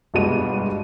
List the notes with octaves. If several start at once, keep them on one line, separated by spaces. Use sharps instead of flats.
G1 B2 G3 G#3 D#7